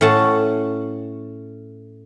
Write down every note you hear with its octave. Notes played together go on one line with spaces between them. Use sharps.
A2 C#4 F#5 A5